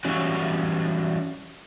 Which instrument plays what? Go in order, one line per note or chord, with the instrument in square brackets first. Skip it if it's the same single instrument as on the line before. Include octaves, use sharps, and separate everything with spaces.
[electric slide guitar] E3 F#3 G3 C#4 F#4